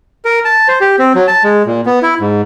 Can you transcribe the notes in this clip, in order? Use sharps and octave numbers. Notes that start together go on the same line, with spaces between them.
A#4
A5
C5
G4
C4
F#3
A5
G#3
A#2
B3
E4
G#2